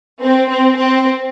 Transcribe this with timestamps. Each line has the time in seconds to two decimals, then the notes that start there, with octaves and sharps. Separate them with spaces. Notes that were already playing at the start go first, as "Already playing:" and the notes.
0.22 C4
0.50 C4
0.78 C4